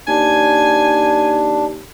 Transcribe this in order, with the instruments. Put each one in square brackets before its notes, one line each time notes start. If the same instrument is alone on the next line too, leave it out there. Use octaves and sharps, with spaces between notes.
[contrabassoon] D#2 [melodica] D4 [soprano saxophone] G#5